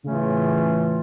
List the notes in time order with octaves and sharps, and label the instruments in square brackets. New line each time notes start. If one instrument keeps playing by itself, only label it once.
[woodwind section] A2 E3 A3 C#4 F4 [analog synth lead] C#3